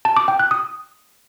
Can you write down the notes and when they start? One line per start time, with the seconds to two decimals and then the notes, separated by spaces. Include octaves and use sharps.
0.05 A5
0.17 D6
0.28 G5
0.39 F#6
0.51 D#6